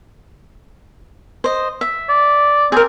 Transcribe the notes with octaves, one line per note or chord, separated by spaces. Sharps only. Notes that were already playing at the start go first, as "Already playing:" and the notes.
C5 D#5
E5
D5
C4 G#4 A#4